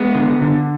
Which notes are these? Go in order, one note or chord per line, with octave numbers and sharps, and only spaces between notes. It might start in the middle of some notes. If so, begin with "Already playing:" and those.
Already playing: G#3 B3
D3
D3